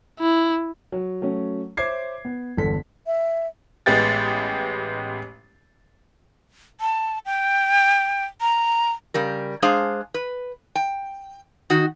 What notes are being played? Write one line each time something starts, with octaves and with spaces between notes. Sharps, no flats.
E4
F#3
F#3 A3 C#4
C5 C#5 E5 D6 G#6 C7
B3
G1 E2 D3 A4 B6
E5
A1 G#3 B3 G4 A6
A5
G5
A#5
C#3 G3 A#4
G#3 D4 G#4 C5 F5
B4
G5
D#3 D#4 F#4